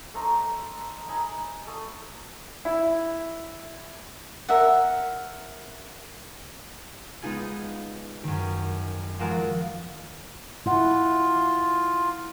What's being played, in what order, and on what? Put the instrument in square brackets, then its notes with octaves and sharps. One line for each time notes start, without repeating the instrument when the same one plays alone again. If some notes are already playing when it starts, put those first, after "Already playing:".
[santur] A3 D#4 C5 A#5
D#4 G#5 B5 E6
A3 D#6
[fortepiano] E4
[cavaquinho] A#4 E5 F#5
[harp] G#3 B3 D#4 F4 G#4
F#2 D#3
F3 F#3 G#3 F#4 A#4 F5
[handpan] E4 F#5 [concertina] F4